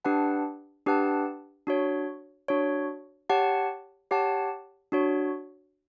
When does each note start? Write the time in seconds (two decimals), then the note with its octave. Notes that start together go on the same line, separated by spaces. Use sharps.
0.04 D4 G4 B4 F#5 A5
0.86 D4 G4 B4 F#5 A5
1.67 D4 F#4 C#5
2.48 D4 F#4 C#5
3.29 G4 C#5 F#5 A5
4.11 G4 C#5 F#5 A5
4.92 D4 F#4 C#5